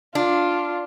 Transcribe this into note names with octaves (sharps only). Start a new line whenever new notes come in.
D4 F4